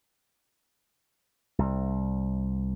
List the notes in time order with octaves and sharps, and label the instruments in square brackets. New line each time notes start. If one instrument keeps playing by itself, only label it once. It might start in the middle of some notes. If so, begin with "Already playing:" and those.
[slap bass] C2